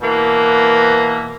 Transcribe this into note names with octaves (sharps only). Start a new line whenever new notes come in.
B2 E3 A#3